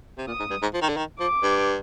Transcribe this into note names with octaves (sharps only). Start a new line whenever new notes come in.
C3
A#2 D#6
G#2
G2
G#2
F3
D#3
D3
D#3
F3 D6
G2